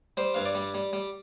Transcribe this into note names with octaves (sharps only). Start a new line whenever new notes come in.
G3 C5
G2 F5
D5
G3
G3
G3